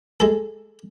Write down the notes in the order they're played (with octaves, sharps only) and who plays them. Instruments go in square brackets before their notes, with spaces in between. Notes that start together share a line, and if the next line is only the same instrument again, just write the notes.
[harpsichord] G#3 A4